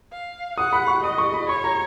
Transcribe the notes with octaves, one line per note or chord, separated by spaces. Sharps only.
F5
F#5 D#6
B5
C#6
D#5 D#6
C#6
B5
C#5 C#6
A#5